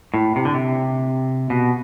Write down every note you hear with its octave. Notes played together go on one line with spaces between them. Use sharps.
A2
C3
D3
C3
B2